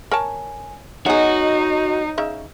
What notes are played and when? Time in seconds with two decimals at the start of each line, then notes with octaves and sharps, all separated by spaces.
0.11 A#4 C#5 G#5 A5
1.06 B3 D#4 F#4 G#4 C#5 D#5
2.18 C#3 D#4 E5